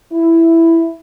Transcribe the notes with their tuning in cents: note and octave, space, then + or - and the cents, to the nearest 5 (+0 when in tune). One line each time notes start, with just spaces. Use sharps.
E4 +5